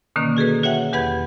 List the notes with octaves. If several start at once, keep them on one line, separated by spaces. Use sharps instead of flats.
B2 D3 D#3 A#3 C#4
F#4 G#4 A4 B4
F#4 C#5 E5 F#5 G5
E2 G4 B4 F#5 B5 G#6